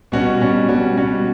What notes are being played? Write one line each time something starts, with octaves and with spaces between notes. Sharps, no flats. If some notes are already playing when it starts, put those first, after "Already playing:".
B2 G3 C#4 F#4
B2 G3 C#4 F#4
B2 G3 C#4 F#4
B2 G3 C#4 F#4